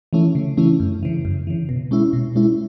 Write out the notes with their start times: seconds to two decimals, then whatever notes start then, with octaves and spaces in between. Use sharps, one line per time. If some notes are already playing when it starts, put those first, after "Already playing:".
0.13 E3 A3 C#4 E4
0.35 C#3
0.57 E3 A3 C#4 E4
0.80 F#2
1.03 C#3 E3
1.25 F#2
1.47 C#3 E3
1.69 B2
1.91 G#3 C#4 E4
2.13 B2
2.36 G#3 C#4 E4